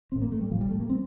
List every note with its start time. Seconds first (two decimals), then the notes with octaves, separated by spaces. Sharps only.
0.12 A1 A2 C4
0.22 A#3
0.32 A3
0.41 G3
0.51 A2 F3
0.56 A1
0.61 G3
0.71 A3
0.80 A#3
0.90 C4